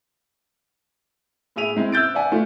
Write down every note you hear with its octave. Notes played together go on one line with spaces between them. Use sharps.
A2 E4 G#4 E5 D#7 F7
G#3 C4 E4
E6 F#6 G6 A6 D7
D5 E5 F#5 G#5
A3 F4